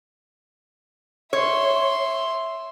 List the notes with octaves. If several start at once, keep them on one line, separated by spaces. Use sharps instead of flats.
C#5 E5 C6